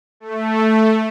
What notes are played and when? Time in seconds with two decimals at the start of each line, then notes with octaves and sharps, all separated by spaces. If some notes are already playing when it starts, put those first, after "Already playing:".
0.20 A3